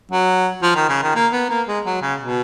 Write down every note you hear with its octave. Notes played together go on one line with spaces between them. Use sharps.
F#3
F3
D#3
C#3
D#3
A#3
B3
A#3
G#3
F#3
C#3
B2